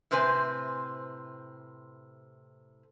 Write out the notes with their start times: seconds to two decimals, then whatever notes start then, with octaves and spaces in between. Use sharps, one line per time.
0.11 A2 C3 C4 B4 C5 G#5